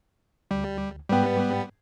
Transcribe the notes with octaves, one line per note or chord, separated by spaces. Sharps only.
D2 G3
G#2 G3 B3 B4 G5